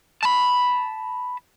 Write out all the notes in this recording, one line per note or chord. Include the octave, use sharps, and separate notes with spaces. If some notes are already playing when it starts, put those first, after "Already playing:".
A5 B5